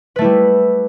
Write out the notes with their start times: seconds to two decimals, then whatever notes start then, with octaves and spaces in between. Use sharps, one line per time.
0.16 B4
0.19 A3
0.21 E4
0.24 G3